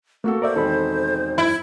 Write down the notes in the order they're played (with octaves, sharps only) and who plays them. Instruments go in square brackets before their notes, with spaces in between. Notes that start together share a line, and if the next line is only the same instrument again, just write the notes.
[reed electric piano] A3 [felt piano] A#3 F#4 A4 [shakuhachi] C4
[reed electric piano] A#4 D5 E5 [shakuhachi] C5
[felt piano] E1 D#3 C4 [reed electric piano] A4 B5
[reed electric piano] F#2 G#6 [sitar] E4